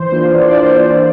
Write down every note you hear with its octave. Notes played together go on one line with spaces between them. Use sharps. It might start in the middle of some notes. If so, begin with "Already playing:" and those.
Already playing: E3 C5
A#3 D4 F4
E3 D5
C5